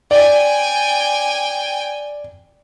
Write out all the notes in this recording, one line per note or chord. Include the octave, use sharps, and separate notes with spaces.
D5 G5 G#5